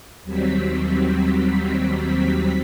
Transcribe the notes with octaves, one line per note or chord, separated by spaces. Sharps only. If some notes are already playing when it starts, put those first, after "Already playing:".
D#2 F#3 G3 C4 B6